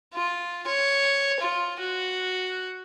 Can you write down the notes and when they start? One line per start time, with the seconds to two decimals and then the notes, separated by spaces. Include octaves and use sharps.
0.14 F4
0.67 C#5
1.41 F4
1.80 F#4